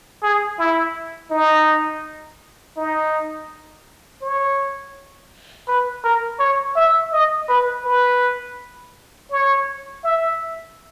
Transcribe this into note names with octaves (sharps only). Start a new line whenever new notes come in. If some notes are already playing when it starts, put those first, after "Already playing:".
G#4
E4
D#4
D#4
C#5
B4
A#4
C#5
E5
D#5
B4
B4
C#5
E5